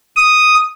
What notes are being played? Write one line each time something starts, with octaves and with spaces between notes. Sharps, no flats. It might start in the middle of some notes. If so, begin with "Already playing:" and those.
D#6